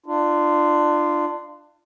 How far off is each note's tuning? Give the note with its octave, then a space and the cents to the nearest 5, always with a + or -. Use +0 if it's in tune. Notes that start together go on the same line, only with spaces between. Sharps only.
D4 +25 F4 -20